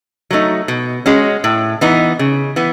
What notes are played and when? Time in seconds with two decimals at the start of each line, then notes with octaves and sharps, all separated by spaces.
0.31 F#3 A3 D#4
0.68 B2
1.06 G#3 C#4 F#4
1.44 A2
1.81 E3 B3 D#4
2.19 C#3
2.56 E3 B3